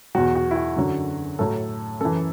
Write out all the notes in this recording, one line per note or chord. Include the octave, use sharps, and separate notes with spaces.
E2 B2 F#3 F#4
F#4
E4
F#4
F#2 D3 F#3
A2 F#3 A4
F#2 E3 A4